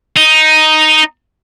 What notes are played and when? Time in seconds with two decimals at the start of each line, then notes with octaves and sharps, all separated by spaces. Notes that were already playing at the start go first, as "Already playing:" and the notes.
0.17 D#4